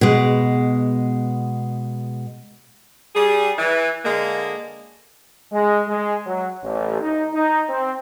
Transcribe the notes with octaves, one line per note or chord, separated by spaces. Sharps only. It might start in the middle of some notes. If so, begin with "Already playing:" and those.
B2 G#3
G3 G#4
E3
D3 G#3 A#3
G#3
G#3
F#3
A1
D#4
D#4
C4